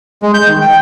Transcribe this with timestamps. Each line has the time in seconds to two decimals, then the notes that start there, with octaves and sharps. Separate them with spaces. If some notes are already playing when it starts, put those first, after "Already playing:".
0.23 G#3
0.34 G6
0.48 D#3
0.61 G5